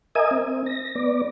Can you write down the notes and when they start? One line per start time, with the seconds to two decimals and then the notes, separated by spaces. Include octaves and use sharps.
0.15 A#4 D#5 E5 G#5 D#6
0.31 C4
0.66 A#6
0.95 B3 D5